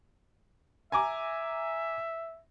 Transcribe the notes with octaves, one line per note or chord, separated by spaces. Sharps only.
E5 G#5 A#5 D6